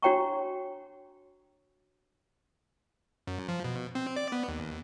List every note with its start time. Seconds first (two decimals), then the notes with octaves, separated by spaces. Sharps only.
0.02 D4 F#4 C#5 G5 A#5 C#6
3.27 F#2
3.48 F3
3.64 B2
3.95 C4
4.16 D5
4.32 B3
4.48 D#2